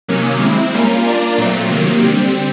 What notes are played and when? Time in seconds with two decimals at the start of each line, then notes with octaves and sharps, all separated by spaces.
0.08 C3 D#3 F#3 A#3 C#4
0.41 G#3 C4 E4
0.74 G3 A#3 C#4 F4 A#4
1.06 A#3 D4 F4 A#4 D5
1.38 A#2 F#3 A3 C4 F4
1.70 C3 D#3 F#3 A#3
2.03 D3 G3 C4